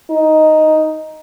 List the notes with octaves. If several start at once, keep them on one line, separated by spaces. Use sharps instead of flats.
D#4